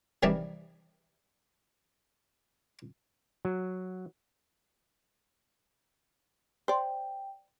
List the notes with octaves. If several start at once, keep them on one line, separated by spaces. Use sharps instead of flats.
C3 D#3 E3 G3 D4
F#3
C5 D5 G5